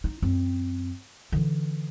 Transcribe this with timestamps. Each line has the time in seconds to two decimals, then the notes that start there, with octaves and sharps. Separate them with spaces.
0.04 D#4
0.22 F#2 C4
1.32 D3 E3